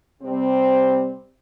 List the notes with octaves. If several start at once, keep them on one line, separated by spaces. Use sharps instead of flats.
C3 G3 C4